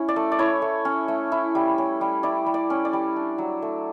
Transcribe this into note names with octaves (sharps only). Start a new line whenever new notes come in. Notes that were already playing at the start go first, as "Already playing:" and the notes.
Already playing: C#4 E4
D5
A3
D5
E4 C#5
A3
C#4
A3
E4
G3
C#4
G3
E4 D5
G3
D5
C#4
D5
G3
D4
F#3
A3